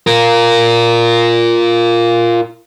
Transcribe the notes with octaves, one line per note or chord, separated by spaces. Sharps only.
F4 A#4